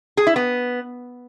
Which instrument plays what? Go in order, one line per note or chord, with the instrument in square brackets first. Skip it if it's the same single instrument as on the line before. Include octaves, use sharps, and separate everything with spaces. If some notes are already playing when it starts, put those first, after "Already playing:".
[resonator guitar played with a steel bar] G#4
E4
B3